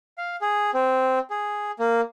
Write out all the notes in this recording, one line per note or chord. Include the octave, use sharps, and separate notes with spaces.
F5
G#4
C4
G#4
A#3